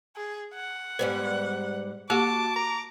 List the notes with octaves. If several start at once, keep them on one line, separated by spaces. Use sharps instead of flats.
G#4
F#5
G#2 G3 B3 C5
A#3 F#4 G4 A5 D6
A#5